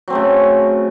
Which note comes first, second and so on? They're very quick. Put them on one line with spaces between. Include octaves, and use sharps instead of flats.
F#3 C4 A3 C#3